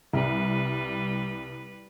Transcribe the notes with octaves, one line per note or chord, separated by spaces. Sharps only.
C2 G3 B4